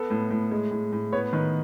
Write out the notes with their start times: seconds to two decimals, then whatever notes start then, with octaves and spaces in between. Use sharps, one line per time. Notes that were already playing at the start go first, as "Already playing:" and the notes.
Already playing: B3 A4
0.10 A2
0.31 A2
0.51 G#3
0.71 A2
0.93 A2
1.13 B3 C#5
1.33 D#3 B4